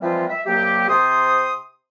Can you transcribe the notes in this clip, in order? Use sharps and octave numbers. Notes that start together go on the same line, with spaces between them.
E3 F3 G3 G#3 C4 F4
E5
C2 F#3 A#3 G4
C3 C5 C6 D#6